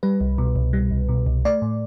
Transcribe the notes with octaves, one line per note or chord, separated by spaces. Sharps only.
G3 B4
C2
B2
C2
G3
C2
B2
C2
A3 D5
A2